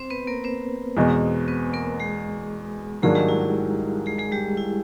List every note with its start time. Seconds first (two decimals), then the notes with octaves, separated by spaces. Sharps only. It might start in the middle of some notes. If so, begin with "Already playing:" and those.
Already playing: C4 C5
0.10 B3 B4
0.27 A#3 A#4
0.44 C4 C5
0.96 E2 B2 G#3
1.48 B3 B4
1.73 A#3 A#4
2.00 G#3 G#4
3.03 G#2 D#3 F#3 G#3 A#3 D4 G#4
3.15 G3 G4
3.28 E4
3.41 E4
4.06 G#3 G#4
4.18 G#3 G#4
4.32 G3 G4
4.57 E4